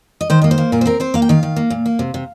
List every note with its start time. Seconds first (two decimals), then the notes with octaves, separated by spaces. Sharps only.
0.21 D#5
0.30 D#3 C5
0.42 A#3 D#5
0.51 C5
0.58 A#3
0.72 A#2 A#4
0.81 C5
0.86 C4 A#4
1.00 C4 C5
1.14 A#3 F5
1.22 G5
1.29 D#3 F5
1.43 D#3
1.56 A#3
1.70 A#2
1.86 A#3
1.99 C3
2.14 C3